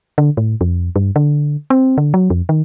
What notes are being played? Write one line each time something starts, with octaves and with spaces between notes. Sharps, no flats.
D3
A2
F2
G2
D3
C4
D3
F#3
F2
D#3